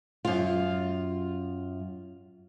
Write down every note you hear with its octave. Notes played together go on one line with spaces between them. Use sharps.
F#2 F4